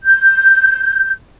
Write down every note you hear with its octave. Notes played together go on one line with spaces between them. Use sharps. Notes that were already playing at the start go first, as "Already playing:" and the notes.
G6